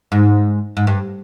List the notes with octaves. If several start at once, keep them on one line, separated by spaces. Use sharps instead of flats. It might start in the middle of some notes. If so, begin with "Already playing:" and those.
G#2
G#2
G2